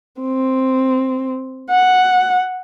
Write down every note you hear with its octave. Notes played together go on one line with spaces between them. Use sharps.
C4
F#5